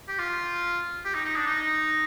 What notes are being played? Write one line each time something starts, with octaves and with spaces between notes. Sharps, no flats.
G4
F4
G4
D#4
D#4
D4
D#4